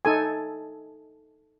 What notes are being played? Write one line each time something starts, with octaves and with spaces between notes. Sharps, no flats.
D#4 A4 G#5